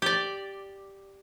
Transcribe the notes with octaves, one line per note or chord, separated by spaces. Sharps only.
G4 D5